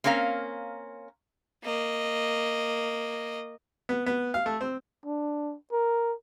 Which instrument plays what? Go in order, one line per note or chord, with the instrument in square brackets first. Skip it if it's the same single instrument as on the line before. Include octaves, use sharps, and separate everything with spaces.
[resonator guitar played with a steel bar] A#3 C4 C#4 A#4 F5
[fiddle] A#3 D#5
[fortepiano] B3
B3
F5
A3
C4
[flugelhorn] D4
A#4